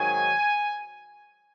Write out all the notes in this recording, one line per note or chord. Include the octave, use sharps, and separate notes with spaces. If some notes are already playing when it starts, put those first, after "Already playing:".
Already playing: G#2 D#3 F#3 G#5